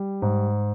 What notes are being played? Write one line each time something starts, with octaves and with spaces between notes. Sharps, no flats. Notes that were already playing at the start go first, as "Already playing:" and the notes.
Already playing: G3
G#2